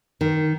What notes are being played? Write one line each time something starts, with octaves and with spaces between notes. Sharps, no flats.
D#3